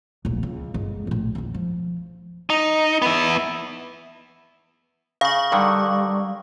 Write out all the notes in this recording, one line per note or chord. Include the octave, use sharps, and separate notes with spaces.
D1 A#1
C#2
G1 G#3
A#1 A2
A#1 E2
F3
D#4
B3 E5
C#3 F5 C#6
G2 D3 D#3 G3